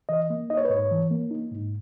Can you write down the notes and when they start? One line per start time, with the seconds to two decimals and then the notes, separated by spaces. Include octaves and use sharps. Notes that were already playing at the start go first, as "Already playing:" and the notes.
0.09 E3 D#5
0.30 A#3
0.50 D#4 D#5
0.57 C#5
0.65 B4
0.70 G#2 C#5
0.91 E3
1.11 A#3
1.31 D#4
1.51 G#2